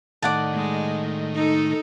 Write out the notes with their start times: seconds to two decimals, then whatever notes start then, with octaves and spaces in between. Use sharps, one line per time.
0.22 A2 D#3 D5 F#5 A5
0.55 G#3
1.35 D#4 A4